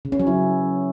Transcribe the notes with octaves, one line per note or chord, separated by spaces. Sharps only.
C#3
C#4
F#3
E4